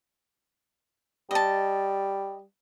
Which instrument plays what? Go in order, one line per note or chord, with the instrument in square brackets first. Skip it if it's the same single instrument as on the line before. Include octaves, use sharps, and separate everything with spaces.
[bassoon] G3 [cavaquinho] D#5 A5